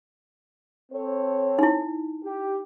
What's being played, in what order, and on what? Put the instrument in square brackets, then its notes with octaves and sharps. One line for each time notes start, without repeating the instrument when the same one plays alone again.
[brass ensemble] C4 A4 C#5
[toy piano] D#4 E4
[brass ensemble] G4